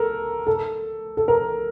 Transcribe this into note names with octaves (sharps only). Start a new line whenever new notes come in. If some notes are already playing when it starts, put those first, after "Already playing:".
Already playing: A4 A#4
A4
A4
A#4